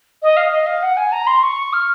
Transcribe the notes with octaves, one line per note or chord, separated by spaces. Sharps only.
D#5
F5
D#5
F5
F#5
G#5
A#5
C6
C#6
F6